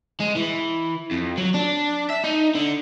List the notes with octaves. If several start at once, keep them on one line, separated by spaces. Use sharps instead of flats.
G#3
E3
F2
F#3
D4
E5
D#4
D3